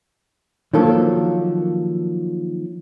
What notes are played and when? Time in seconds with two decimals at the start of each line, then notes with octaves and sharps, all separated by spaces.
0.73 D#3 F3 F#3 A#3 A4